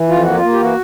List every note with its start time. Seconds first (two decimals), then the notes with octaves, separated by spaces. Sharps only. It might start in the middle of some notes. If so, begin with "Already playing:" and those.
Already playing: E3
0.09 F2 F4
0.23 A#3 F#4
0.36 F4
0.43 A#3
0.52 G4
0.60 E3 F#4